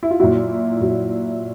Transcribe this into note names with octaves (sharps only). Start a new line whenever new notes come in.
E4
F4
A#2 F#3 E4 F#4
A#2 F#3